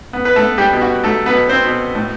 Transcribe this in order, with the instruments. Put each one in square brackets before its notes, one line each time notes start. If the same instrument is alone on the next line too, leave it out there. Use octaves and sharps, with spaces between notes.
[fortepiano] B3
B4
A3 A4
B3
G3 G4
B2
F#4
F#3 A3 A4
B3 B4
B2
C4 C5
B2
A2